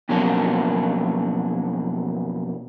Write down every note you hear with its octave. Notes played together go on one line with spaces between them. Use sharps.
F2 B2 F#3 A#3 C#4 D4